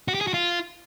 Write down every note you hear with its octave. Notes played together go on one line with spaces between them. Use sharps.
F#4
G4
G#4
F#4
F4